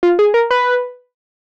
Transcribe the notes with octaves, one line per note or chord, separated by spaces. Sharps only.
F4
G#4
A#4
B4